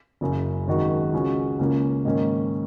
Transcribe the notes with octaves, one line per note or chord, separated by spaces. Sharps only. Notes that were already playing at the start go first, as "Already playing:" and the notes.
F#1 F#2 C#3
G#1 F#2 D#3 G#3 F#4
C#2 C#3 G#3 C#4 F#4
C#2 C#3 A#3 C#4
G#2 D#3 A#3 C#4